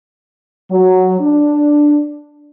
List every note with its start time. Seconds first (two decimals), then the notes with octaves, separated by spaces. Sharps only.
0.71 F#3
1.21 D4